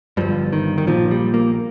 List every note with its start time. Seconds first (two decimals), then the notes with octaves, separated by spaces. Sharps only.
0.17 G1 G2 F3
0.53 D#3
0.78 D#3
0.87 A#1 A#2 F3
1.11 G3
1.34 A#3